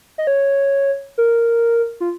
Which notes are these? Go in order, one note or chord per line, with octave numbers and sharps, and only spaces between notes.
D#5
C#5
A#4
F4